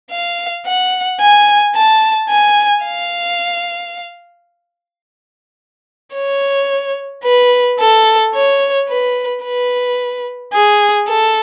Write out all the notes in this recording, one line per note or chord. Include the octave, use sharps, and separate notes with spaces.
F5
F#5
G#5
A5
G#5
F5
C#5
B4
A4
C#5
B4
B4
G#4
A4